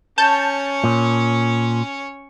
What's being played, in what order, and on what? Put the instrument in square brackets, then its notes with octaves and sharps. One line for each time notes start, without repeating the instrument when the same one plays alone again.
[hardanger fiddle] C#4 C#5 [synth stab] A5 G6
[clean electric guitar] A#2